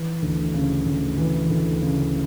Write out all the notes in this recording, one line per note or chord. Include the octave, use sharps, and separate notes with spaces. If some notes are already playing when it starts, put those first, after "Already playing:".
Already playing: E3
D2
C#3
D2
E3
D2
C#3